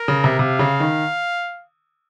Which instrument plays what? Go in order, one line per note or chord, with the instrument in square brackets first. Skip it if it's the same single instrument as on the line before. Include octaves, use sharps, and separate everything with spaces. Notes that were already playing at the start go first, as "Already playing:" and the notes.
Already playing: [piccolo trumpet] A#4
[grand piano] C#3
C3
[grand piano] C3 [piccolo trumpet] F5
[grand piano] C#3
D#3